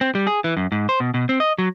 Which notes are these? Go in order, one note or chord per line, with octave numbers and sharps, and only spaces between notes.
C4
G3
G#4
E3
F#2
G#2
C5
B2
B2
C4
D#5
F#3